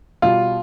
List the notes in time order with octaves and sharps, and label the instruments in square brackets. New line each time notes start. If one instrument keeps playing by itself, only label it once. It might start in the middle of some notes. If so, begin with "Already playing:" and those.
[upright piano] B2 G3 F4